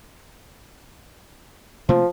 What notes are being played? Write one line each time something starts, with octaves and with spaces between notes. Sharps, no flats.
C3 F3 A3 A#3